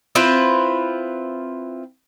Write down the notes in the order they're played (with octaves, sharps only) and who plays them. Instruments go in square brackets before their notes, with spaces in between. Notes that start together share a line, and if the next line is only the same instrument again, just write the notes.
[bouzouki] C4 E4 F4 B4